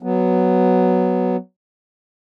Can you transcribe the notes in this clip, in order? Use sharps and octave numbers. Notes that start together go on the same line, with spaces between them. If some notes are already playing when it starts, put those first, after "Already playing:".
F#3 B3